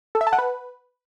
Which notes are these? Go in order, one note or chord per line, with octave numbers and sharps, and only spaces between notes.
A4
E5
A5
F#5
B4